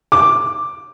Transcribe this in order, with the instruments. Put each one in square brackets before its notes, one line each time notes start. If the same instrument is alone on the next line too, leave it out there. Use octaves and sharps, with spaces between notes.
[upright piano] D6